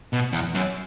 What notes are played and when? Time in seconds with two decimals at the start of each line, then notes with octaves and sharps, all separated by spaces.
0.13 B2
0.32 E2
0.54 F#2